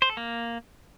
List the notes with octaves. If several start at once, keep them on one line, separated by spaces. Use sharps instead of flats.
C5
A4
A#3